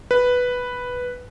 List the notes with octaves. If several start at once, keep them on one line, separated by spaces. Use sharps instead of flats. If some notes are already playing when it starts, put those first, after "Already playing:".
B4